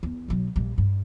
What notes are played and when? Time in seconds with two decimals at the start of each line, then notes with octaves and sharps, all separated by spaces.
0.03 E2
0.28 B1 F#3
0.56 A#1 G3
0.78 G2